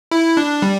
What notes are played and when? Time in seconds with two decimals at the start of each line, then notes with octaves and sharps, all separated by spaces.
0.11 E4
0.37 D4
0.62 G3